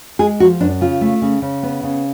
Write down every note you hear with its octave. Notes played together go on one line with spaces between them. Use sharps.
G#3 G#4
F3 F#4
F#2 D4
C#3 F4
A3
C#3
C#3
B3
C#3